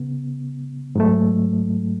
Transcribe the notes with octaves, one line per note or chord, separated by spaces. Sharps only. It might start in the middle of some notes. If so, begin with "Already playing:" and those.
Already playing: C#3 B3
G#2 F#3 A3